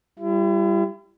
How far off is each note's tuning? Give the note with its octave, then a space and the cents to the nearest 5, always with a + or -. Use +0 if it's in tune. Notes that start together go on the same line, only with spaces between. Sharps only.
G3 +0 E4 +40